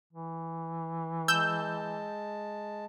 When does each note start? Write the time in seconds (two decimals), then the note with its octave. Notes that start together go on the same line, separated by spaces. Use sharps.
0.13 E3
1.28 G#3 A5 E6 G6